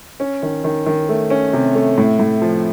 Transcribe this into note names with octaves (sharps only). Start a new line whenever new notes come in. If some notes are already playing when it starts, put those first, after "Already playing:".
C#4
D#3
D#3
D#3
A3
C#4
C3
A3
A2
A2
F3